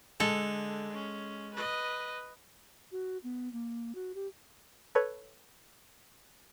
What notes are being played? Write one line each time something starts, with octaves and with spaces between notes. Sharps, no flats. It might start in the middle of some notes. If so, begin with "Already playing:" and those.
D3 G#3 A4
C#4
B4 D#5
F#4
B3
A#3
F#4
G4
A4 B4 C#5